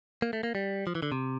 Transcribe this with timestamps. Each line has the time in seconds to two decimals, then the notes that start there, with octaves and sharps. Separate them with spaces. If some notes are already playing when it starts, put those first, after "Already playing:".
0.22 A#3
0.33 A3
0.43 A#3
0.55 G3
0.87 F3
0.95 E3
1.02 D3
1.12 C3